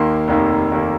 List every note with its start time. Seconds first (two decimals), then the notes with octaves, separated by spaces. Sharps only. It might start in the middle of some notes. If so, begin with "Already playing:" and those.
Already playing: D#2 D#3 A#3 C6
0.28 F1 D#2 D#3 A#3
0.71 F1 D#2 D#3 A#3